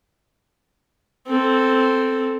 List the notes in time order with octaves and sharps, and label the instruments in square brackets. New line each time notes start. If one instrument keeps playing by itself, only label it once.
[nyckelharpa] C4 A4